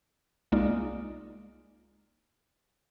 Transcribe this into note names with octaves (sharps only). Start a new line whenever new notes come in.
C2 G#3 A#3 D#4 F4 D5